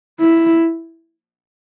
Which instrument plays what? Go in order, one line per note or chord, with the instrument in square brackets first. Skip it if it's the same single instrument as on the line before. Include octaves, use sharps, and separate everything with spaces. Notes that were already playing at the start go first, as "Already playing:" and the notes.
[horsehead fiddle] E4